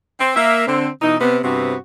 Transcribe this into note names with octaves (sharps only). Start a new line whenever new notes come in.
C4
A#3 E5
D3 C4
B2 E3 D#4
C3 B3
G2 C3 B3 C4 F#4